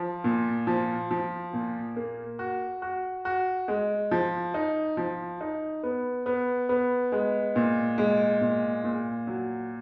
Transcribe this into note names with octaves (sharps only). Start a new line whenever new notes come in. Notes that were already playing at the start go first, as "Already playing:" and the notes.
Already playing: F3
A#2
F3
F3
A#2
A#3
F#4
F#4
F#4
G#3
F3
D#4
F3
D#4
B3
B3
B3
G#3
A#2
G#3
A#2
A#2
F#3